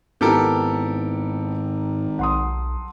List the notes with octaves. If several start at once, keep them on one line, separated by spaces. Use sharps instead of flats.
G#1 G#2 B3 D#4 E4 G4 A4 A#4
B1 F#5 C6 D#6